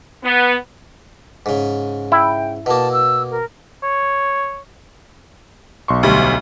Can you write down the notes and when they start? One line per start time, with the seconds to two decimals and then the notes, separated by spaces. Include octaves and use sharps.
0.24 B3
1.46 G#2 C#3
2.12 E4 G5
2.66 B2 A#3 A5
2.92 E6
3.31 A#4
3.83 C#5
5.88 B1 C6 C#6
6.03 D2 G3